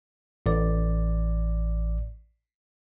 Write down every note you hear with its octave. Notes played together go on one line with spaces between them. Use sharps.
A1 D5